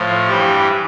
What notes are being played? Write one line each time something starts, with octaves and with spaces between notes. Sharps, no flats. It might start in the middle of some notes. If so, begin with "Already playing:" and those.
Already playing: A2 F3
G2 E3 G3 G4